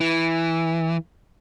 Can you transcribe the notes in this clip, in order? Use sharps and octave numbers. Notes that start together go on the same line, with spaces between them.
E3